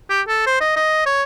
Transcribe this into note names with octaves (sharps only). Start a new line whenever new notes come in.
G4
A4
C5
D#5
D#5
C#5